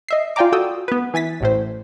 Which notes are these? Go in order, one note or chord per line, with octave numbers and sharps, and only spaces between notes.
D#5 E5 C7
F4 D5 G5 G#5 A#5 D6
F#4 A4 G5 D#6 E6
B3 B4
E3 G#5 A6 B6
A1 A2 C5